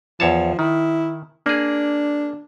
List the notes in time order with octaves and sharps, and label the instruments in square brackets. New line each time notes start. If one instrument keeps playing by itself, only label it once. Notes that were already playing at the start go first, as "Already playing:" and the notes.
[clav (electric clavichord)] E2 C#5 A5 [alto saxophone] F3
[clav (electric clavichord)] D#3 [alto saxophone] E4
[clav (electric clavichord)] A#3 G#4 [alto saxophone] D4